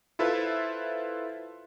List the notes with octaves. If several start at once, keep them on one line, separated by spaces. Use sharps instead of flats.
E4 F4 A4 B4 C5 E5